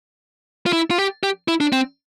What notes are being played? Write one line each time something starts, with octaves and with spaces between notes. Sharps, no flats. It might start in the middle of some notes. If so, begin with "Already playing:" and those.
F4
E4
F4
G4
G4
E4
D4
C4